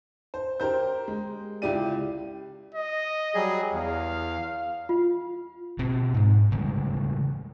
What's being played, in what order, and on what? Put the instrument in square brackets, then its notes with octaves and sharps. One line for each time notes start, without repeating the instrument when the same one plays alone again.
[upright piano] C5
G4 A#4 C5 G6
G#3
C#2 E4 G4 D5 D#7
[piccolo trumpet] D#5
[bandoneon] F#3 G3 G#4
[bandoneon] E2 [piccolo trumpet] F5
[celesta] F4
[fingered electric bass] B2 C4
G#2 G#3
C#3 E3 G3 G#3